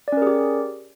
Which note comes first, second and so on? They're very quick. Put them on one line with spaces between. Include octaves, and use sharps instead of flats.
D5 C#4 A#4 G#4 G4